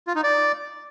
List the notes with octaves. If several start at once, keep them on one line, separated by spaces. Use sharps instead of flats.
F4
D#4
D5